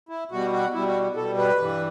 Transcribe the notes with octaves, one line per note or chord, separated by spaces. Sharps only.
E4
B2 G3 F#4
F#4
B2 G3 E4
F#4
B2 G3 A4
B4
G2 E3 G3